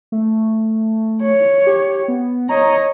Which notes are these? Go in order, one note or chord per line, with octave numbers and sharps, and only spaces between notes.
A3
C#5
G4
B3
C#5 D#5 A#5